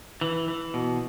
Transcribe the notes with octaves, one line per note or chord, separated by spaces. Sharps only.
E3
E3
B2